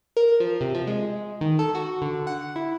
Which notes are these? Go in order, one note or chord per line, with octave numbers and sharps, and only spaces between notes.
A#4
F3
C3
F3
G#3
D#3
A4
F#4
D3
F#5
E4